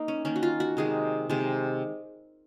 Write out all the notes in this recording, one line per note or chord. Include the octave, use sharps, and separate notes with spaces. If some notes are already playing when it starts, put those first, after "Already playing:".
Already playing: A#3 D#4
C#4
D#3 A#3 C#4
F#4
F4
F#4
C3 D#3 G#3 G#4
C3 D#3 G#3